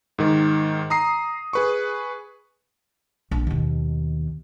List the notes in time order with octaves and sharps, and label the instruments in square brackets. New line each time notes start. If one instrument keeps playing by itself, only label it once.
[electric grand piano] G#2 D#3
A#5 D#6 C7
G#4 B4 C#6
[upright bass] A#1
D#2 B2